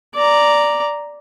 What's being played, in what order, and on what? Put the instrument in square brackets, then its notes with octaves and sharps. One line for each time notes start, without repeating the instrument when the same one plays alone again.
[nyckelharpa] D5 A#5